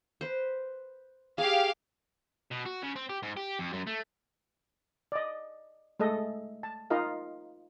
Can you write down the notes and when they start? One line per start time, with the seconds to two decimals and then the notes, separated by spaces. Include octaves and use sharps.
0.21 B4 C5
1.38 G4 G#4 F5
2.51 B2
2.66 F#4
2.83 C#3
2.96 C4
3.09 G4
3.23 G#2
3.37 G4
3.59 F2
3.73 F#2
3.87 A3
5.12 D5 D#5
6.00 G#3 A3 A4 D#5
6.63 A5
6.90 D#4 F4 A#4 D#5 F5